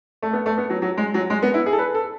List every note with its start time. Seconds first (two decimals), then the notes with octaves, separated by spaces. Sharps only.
0.22 A3
0.33 B3
0.46 A3
0.57 B3
0.70 F#3
0.82 F#3
0.97 G#3
1.14 F#3
1.30 G#3
1.42 B3
1.54 E4
1.66 G#4
1.72 A4
1.78 B4
1.94 A4